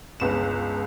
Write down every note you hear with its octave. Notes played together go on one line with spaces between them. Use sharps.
G1 C#2 G#3 E7